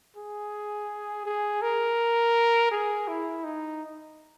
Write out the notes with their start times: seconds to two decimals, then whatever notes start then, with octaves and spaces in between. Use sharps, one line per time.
0.16 G#4
1.25 G#4
1.62 A#4
2.71 G#4
3.08 E4
3.44 D#4